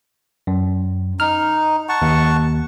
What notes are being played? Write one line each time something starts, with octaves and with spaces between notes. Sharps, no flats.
F#2
D#4 F6
F#5 A5 C#6
D#2